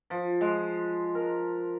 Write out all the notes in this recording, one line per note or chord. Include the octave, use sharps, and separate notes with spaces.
F3
G#3
A#4